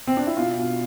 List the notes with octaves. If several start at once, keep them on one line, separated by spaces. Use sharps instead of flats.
C4
D4
E4
B2 F4
B2